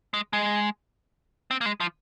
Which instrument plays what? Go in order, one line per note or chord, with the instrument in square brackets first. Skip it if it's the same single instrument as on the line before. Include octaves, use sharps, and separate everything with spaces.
[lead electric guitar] G#3
G#3
C4
A#3
G#3
F3